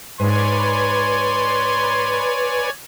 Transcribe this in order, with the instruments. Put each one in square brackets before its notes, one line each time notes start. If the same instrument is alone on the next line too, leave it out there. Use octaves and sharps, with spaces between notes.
[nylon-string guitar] G#2 [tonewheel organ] B4 [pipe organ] C#5 D5 G#5 [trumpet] C6